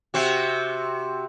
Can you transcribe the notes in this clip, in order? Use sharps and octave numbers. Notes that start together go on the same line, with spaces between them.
C3 C4 F#4